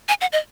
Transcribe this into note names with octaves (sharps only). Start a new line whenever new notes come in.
G#5
F#5
D#5